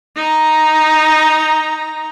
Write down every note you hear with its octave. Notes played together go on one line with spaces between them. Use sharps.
D#4 A#5